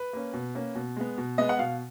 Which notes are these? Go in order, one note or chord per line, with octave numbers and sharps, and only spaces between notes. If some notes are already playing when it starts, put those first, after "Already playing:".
Already playing: B4
A#3 C#4
B2
A#3 C#4
B2
G#3 B3
B2
G#3 B3 D#5
F#5
B2 F5